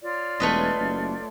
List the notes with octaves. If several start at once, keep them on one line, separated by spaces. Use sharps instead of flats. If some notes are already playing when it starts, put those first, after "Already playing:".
F4 C#5 D5
E1 A3 B4 D#5
F#1